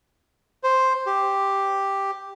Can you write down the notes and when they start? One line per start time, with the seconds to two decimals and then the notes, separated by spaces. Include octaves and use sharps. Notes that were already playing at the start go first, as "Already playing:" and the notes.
0.63 C5
1.06 G4